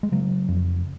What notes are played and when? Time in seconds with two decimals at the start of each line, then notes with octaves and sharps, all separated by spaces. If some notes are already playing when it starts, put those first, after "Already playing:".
0.03 G#3
0.12 C#3 F#3
0.48 F2